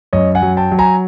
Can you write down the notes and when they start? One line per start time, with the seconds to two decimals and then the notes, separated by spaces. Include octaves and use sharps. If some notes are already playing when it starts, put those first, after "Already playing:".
0.13 F#2 C#5 D#5
0.35 F#5 G#5
0.42 F#3
0.57 G5 A5
0.72 F#3
0.79 G#5 A#5